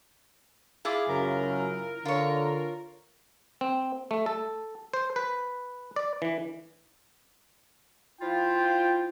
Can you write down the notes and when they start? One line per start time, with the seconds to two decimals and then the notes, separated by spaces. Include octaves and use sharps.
0.85 E4 F4 G#4 D6
1.09 F#2 C#3 A#4
2.05 D3 F4 C#5
3.61 C4
4.11 A3
4.26 A4
4.94 C5
5.16 B4
5.96 D5
6.22 E3
8.21 F3 E4 F4 G5